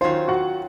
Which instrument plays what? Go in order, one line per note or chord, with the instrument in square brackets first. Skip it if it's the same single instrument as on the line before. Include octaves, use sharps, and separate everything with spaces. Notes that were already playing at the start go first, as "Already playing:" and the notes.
[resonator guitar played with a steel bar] D#3 F#3 C#4 F4 [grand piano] C5 C6
[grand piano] F#4 F#5